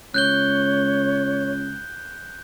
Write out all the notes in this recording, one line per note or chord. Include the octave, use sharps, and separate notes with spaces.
C#2 C#5 F#6 G6 G7